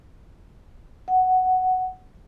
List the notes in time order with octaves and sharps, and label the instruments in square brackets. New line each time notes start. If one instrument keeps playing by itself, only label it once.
[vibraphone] F#5